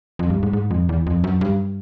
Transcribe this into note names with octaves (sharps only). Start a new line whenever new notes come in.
F2
G2
G#2
G#2
F2
E2
F2
F#2
G2